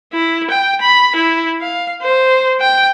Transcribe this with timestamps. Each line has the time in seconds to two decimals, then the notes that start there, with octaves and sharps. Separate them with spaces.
0.13 E4
0.51 G5
0.82 B5
1.16 E4
1.62 F5
2.02 C5
2.61 G5